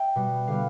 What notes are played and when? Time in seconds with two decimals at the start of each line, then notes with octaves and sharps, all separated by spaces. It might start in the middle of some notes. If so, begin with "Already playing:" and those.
Already playing: E5 G5
0.15 B2 G3 B3
0.47 D3 G3 B3 F5